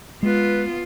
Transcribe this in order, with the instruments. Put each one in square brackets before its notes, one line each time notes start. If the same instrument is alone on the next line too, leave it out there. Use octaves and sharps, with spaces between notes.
[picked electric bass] G#3 [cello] B3 F4 [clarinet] B4